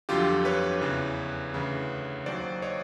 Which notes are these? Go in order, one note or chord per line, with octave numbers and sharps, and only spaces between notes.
G1 F2 D3 F#3 F4 G4
B4 C#5
E2 C#3 E3
D2 C#3 E3
D#2 D#3 F#3 C5 D5
C#5 D#5